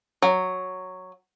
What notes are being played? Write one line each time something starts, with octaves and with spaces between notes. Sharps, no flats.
F#3